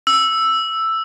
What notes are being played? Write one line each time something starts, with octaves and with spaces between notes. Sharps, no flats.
E6